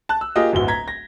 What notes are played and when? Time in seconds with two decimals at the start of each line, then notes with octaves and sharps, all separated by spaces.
0.09 A5 F#6
0.21 E6
0.36 A#3 F4 G4 G#4 D#5
0.53 D1 G1 D2 F#4 G7
0.68 A#5 G#6 B6
0.88 A#6